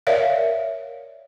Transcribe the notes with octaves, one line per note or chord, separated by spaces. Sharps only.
A#4 C#5 D5 E5 F5